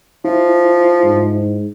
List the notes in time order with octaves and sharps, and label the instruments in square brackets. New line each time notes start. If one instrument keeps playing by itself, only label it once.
[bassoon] F3 [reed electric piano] E4
[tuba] G#2